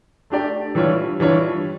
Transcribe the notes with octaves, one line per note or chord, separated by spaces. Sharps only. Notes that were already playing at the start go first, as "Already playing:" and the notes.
A3 D4 G4 D5
E3 G3 D4 F4 C#5
E3 G3 D4 F4 C#5